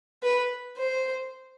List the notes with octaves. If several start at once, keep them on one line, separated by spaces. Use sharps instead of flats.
B4
C5